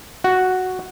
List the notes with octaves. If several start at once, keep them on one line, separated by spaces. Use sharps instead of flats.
F#4